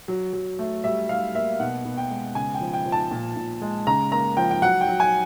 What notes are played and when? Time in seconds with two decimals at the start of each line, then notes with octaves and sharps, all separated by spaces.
0.08 F#3
0.33 F#3
0.59 A3
0.84 G3 E5
1.09 G3 F5
1.35 A#3 E5
1.60 B2 F#5
1.85 B2
1.98 G5
2.10 G#3
2.35 C#3 G#5
2.54 G5
2.61 F3
2.73 G5
2.86 F3
2.92 A5
3.11 A#2
3.36 A#2
3.61 G#3
3.87 C#3 A#5
4.12 A#3 A#5
4.37 F3 G5
4.51 G5
4.62 F#3 F#5
4.81 G5
4.88 F#3
5.00 G#5